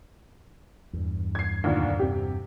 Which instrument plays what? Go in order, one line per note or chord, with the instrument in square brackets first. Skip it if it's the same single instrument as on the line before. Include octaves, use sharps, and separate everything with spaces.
[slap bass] E2 G2
[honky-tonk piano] G#6 C7
D2 A#2 D#3
C3 G4